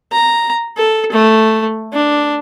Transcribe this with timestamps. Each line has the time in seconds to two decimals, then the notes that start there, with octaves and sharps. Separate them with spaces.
0.12 A#5
0.77 A4
1.12 A3
1.93 D4